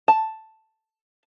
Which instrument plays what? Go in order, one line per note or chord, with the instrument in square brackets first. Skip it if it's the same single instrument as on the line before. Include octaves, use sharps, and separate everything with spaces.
[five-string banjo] A5